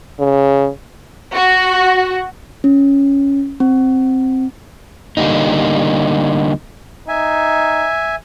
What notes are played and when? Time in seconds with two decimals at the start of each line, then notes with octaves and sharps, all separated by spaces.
0.19 C#3
1.34 F#4
2.64 C#4
3.60 C4
5.17 D3 G3 A#3 D#4
7.08 D#4 E5 G#5